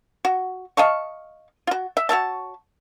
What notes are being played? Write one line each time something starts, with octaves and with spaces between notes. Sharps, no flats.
F#4
D#5 F5 A5 C#6
F4 F#4
E5
F#4 C#5 E5 A5